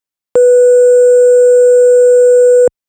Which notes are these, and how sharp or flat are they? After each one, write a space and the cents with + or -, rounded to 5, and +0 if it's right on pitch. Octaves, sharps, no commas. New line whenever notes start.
B4 -5